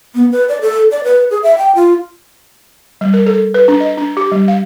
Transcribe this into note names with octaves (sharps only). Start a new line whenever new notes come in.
B3
B4
D5
A4
D5
B4
G#4
E5
G5
F4
G3
A#4
A4
B4
D4
D#5
D4
G4
G3
F5